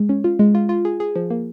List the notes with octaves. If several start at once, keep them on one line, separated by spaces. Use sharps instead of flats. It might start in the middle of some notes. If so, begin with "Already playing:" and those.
Already playing: G#3
C#4
F4
G#3
F4
F4
G#4
G#4
F3
A#3